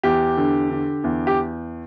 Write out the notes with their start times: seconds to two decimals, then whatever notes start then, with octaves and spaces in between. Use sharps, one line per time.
0.03 E2 G4
0.37 D3
0.70 D3
1.04 E2
1.27 G4